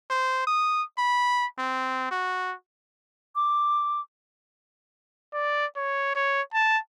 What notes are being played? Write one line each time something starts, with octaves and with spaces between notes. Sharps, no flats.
C5
D#6
B5
C4
F#4
D6
D5
C#5
C#5
A5